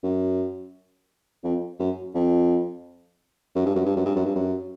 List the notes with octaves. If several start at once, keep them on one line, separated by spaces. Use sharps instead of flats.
F#2
F2
F#2
F2
F#2
G2
F#2
G2
F#2
G2
F#2
G2
F#2